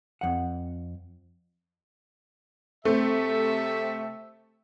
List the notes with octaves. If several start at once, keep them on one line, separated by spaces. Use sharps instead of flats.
F2 F#5
C3 A3 C4 A4 E5